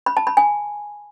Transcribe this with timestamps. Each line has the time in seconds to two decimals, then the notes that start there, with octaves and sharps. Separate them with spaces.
0.06 B5
0.17 A5
0.27 B5
0.37 G#5